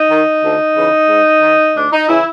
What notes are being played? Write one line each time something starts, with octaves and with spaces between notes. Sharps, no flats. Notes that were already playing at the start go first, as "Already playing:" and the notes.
Already playing: D#4
D#3
D2
C#3 E3
G#2
D#3
D2 D4
D#4
C#3 E3 E4